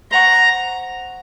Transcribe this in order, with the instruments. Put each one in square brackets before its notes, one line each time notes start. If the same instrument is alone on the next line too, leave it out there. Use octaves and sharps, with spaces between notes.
[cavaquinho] C5 F#5 C#6 [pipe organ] A#5